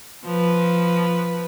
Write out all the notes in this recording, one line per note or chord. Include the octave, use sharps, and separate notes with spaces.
F3 B4